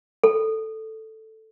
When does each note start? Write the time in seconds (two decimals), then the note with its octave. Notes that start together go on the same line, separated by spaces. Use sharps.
0.24 A4